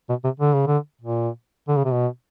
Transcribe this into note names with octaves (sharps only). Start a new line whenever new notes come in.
B2
C3
D3
C#3
D3
A#2
D3
C#3
C3
B2